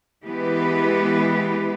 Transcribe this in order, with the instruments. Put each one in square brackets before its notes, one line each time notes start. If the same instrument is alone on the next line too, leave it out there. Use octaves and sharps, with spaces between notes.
[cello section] E3 G#3 B3 G4 B4